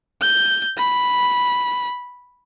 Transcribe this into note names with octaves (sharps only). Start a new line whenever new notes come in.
G6
B5